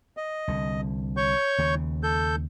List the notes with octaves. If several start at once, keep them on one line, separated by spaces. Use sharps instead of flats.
D#5
C2 D3
C#5 C#6 G6
D#2 C#3
A4 G6